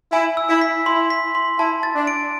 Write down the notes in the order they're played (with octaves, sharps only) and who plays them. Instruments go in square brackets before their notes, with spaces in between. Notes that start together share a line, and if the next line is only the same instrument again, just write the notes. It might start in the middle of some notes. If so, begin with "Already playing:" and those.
[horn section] E4 [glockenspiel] G#5
[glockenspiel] E6
[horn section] E4
[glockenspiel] B6
[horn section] E4 [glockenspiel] C6
[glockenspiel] B6
C6
[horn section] E4 [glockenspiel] A5
[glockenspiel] A6
[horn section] D4
[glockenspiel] D7